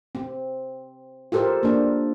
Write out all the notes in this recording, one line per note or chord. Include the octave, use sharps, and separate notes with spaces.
C4
F4 G4 A4 A#4 C5
A#3 D4